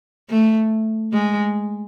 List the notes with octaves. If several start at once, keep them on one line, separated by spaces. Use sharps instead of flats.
A3
G#3